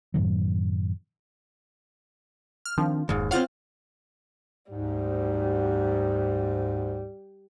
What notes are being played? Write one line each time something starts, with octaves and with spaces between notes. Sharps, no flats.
F#2 A2 D#3 F#3
F6
D#3 F3 C4 D4
F1 D#2 G#2
C4 F4 C#5 F5 F#5 F6
D2 G#2 G3